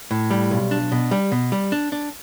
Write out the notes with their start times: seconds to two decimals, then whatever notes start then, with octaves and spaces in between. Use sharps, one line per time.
0.11 A2
0.30 G3
0.51 B1
0.71 D4
0.92 B2
1.11 G3
1.32 B2
1.52 G3
1.72 D4
1.92 D4